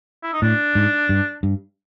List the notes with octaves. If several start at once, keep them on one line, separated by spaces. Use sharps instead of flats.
E4
D#4
A2 D4
G#2
G2
G2